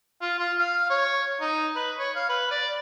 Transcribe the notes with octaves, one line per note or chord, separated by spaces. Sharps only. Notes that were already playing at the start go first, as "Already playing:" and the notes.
F4
F4
F5
C#5
D#4
B4
C#5
F5
B4
D5